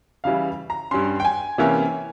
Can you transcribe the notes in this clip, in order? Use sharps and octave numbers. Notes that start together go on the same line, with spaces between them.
C#3 E3 G3 F5
A#5
G2 G3 C#4 C6
G5
G#5
C3 E3 A#3 C#4